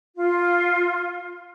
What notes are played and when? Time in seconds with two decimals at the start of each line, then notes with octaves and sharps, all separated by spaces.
0.16 F4